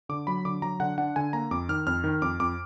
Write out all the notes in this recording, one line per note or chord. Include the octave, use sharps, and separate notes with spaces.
D3 D6
F#3 B5
D3 D6
F#3 A#5
D3 F#5
D4 F#5
D3 G#5
A#3 A#5
F2 D6
D#3 F6
F2 F6
D#3
F2 D6
F2 D6